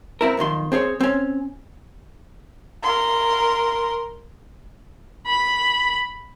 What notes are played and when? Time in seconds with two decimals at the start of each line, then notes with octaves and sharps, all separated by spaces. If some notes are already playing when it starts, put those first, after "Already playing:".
0.21 C4 E4 A#4
0.37 B1 F2 D#3 C6
0.72 C4 G#4 C5 C#5
1.00 C4 C#4
2.83 A#4 C6
5.26 B5